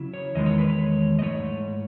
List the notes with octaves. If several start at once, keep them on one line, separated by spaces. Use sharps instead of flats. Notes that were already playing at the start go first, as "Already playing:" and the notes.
Already playing: C#3 F#3 C#4 E4
C#5
E2 D#3 G#3 D#5
C#5
B4
C#5
D#5
G#2 D#3 A3 C#5